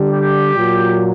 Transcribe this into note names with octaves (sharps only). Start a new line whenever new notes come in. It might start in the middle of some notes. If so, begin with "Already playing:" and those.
Already playing: D3 G3
G4
A#2 F#3